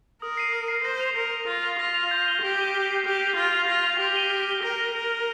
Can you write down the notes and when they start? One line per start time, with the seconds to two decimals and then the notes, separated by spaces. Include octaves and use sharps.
0.22 A#4 D#6
0.37 C7 D#7
0.53 D#6
0.68 C7 D#7
0.84 C5 A#6
1.00 F7
1.16 A#4 A#6
1.32 F7
1.47 F4 A#6
1.63 F7
1.79 F4 A#6
1.94 F7
2.11 G6
2.26 D#7 G7
2.42 G4 G6
2.58 D#7 G7
2.74 F6
2.89 C7 F7
3.05 G4 F6
3.21 C7 F7
3.36 F4 A#6
3.53 F7
3.68 F4 A#6
3.84 F7
4.00 G4 F6
4.16 D#7 G7
4.31 F6
4.46 D#7 G7
4.63 A#4 A#6
4.78 G7
4.94 A#4 A#6
5.10 G7